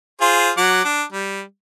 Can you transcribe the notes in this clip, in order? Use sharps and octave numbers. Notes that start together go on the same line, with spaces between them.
F4 G#4 C5
F#3 F#5 D6
D4
G3